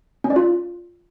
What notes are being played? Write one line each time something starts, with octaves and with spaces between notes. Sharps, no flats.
C#4
D5
F4